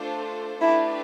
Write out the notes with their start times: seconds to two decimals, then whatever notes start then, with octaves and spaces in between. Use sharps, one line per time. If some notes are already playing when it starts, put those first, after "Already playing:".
Already playing: A3 D4 F4 A4 C5
0.61 A3 D4 E4 G4 B4